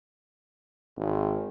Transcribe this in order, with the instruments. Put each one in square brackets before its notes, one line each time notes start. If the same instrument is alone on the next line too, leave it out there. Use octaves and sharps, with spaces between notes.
[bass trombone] G#1